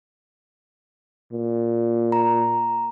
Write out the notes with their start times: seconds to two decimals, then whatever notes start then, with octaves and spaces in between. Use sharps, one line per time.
1.32 A#2
2.12 A#5